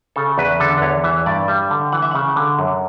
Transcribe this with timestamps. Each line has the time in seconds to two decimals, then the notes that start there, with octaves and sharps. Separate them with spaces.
0.16 C#3 A4
0.38 E2 B4
0.60 D3 A4
0.78 B4
0.82 E2 C#5
1.04 E3 E5
1.26 G2 D5
1.48 G3 E5
1.70 D3
1.92 E3 F#5
2.02 E5
2.11 C#3 F#5
2.36 D3
2.59 F#2